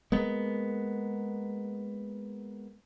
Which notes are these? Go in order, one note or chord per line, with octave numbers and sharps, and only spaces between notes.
G#3 A#3 B3